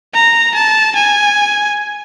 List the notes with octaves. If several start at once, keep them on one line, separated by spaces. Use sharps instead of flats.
A#5
A5
G#5